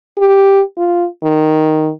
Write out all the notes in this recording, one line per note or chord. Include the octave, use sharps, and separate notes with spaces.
G4
F4
D#3